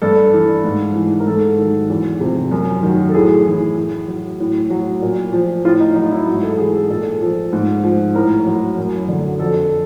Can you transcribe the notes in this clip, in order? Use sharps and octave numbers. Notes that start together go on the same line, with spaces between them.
G2 A4
E3
G#2
E3
A#4
G#2 A4
D#3 F#3
E2
C3 F3
F#2
D#3 F#3
A4
A2 G#4
E3
A2
F#3
A2
F#3
A#2
F3
A2 F4
D#4
F#3 D#4
E4
G#2 F#4
A4
E3 G#4
A4
A#2 A4
F3
G#2
F3
A2 A#4
F#3
F#2
D3 F#3
F2 A4